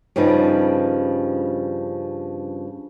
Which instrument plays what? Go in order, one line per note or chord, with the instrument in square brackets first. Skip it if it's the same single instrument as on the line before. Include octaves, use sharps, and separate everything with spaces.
[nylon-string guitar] G2 C#3 F3 G3 D#4